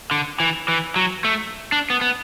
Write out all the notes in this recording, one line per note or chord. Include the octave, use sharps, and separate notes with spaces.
D3
E3
E3
F#3
A3
D4
B3
B3